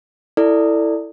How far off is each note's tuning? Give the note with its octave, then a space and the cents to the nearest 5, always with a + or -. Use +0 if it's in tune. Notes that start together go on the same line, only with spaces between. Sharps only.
E4 +0 A4 +20 D5 +0